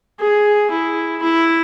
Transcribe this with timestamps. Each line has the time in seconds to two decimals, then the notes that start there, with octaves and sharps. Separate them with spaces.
0.20 G#4
0.71 E4
1.22 E4